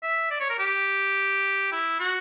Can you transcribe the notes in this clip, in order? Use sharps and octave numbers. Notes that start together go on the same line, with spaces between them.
E5
D5
C#5
A#4
G4
E4
F#4